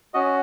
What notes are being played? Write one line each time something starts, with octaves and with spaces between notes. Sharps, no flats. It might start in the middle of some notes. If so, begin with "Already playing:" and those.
C#4 F#4 D#5